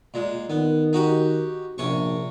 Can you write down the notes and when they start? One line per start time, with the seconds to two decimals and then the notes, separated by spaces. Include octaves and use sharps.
0.14 A#2 G#3
0.50 D#3 B3
0.93 D#4 F#4 G4
1.78 A#1 C3 C#4 C#6